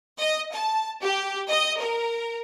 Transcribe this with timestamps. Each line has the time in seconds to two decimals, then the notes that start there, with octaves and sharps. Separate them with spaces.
0.19 D#5
0.52 A5
1.03 G4
1.49 D#5
1.80 A#4